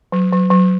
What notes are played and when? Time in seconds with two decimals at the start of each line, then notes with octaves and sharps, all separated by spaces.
0.12 F#3
0.32 F#3
0.50 F#3